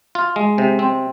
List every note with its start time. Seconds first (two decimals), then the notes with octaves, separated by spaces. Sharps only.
0.15 F4
0.36 G#3
0.58 C3
0.79 C4